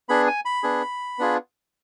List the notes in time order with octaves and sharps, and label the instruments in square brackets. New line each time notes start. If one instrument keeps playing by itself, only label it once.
[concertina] B3 D4 G#4 B5
G#5
B5
B3 D4 G#4
B3 D4 F4 G#4